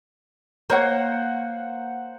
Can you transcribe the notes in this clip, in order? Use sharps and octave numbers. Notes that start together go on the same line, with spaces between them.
A#3 C5 C#5 F#5